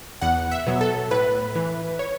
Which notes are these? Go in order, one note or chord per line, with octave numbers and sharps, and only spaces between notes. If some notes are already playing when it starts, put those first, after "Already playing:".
E2 F#5
E5
B2 F#3
A4
A2 B4
E3
C#5